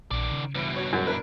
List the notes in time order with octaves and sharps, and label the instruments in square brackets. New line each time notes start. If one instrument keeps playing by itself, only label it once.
[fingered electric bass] A#1 [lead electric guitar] D#3 D5
[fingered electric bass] C#3
[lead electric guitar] G2 B2 [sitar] E3 F#3
[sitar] F#4 C#5
[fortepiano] F#2
[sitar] D4 E4 B4 [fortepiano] A#4